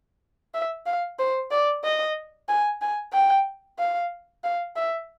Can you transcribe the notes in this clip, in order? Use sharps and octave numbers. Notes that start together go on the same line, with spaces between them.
E5
F5
C5
D5
D#5
G#5
G#5
G5
F5
F5
E5